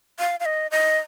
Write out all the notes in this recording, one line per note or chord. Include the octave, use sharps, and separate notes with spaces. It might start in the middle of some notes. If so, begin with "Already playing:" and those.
F5
F5
D#5
D#5